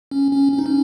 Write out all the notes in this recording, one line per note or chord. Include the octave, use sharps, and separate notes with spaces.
C#4
C#4
C#4
D#4
C#4